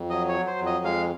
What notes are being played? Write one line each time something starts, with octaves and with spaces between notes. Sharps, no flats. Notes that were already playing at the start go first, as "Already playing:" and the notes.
Already playing: F2
F#3 D#5
C#5
F#3
C5
F2
D#5
G#3 F5